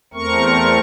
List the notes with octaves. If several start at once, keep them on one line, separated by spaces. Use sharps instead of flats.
E2 A3 C4 A#4 C#6